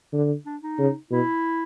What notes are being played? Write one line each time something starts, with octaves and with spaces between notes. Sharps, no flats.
D3
D4
D#4
C#3
B2 E4